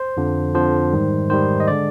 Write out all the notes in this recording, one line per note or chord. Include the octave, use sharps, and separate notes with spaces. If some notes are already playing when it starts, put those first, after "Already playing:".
Already playing: C5
F2 D3 F3
F2 D3 F3 C5
G#2 D#3 G3
G#2 D#3 G3 C5
D#5
D3 G#3 D5